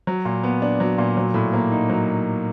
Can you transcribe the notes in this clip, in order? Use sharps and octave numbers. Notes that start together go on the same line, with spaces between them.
F#3
A#2
B3
D4
F#3
A#2
F#3
A2
A#3
D#4
F#3